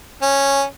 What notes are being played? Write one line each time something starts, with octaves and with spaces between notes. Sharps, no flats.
C#4